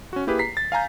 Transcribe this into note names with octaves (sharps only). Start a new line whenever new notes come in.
C#4 F#4
A#3 E4 G4 G#4 B4
A#5 B6 C7
A6
F5 G#5 A#5 G6